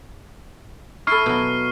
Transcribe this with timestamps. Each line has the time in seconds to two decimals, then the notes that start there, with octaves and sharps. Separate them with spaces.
1.07 E4 A4 C#6 F6 C7
1.26 B2 F#3